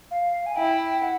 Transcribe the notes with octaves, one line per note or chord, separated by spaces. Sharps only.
F5
G#5
E4 G5
F#5